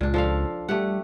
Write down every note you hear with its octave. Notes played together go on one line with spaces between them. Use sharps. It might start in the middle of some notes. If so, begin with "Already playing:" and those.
C#2 A#2 D4
F3 A4 F5
G3 A3 G4 F#5